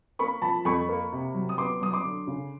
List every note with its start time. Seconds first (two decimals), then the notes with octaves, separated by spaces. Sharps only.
0.19 A#3 B5 C#6
0.42 F3 A5 B5
0.65 F2 B5 C#6
0.89 A#3
1.12 C3
1.35 F#3
1.49 D#6
1.58 B3 C6 D6
1.81 F#3 D#6
1.93 C6 D6
2.04 D3
2.27 C#3